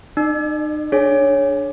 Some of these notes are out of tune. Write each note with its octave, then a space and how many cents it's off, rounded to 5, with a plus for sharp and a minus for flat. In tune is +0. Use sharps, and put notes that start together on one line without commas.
D#4 -35 D5 +35
D4 +0 G#4 +25 C#5 +0